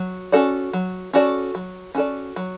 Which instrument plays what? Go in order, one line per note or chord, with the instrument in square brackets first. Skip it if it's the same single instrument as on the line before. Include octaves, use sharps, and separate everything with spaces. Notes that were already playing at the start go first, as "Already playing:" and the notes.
Already playing: [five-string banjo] F#3
C#4 F#4 A4 D5
F#3
C#4 F#4 A4 D5
F#3
C#4 F#4 A4 D5
F#3